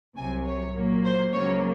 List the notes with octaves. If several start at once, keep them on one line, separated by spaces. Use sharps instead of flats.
C2 C3 F#3 G#5
C#5
A#2 F#3 A#3
C5
C#2 C#3 F#3 A#3 C#5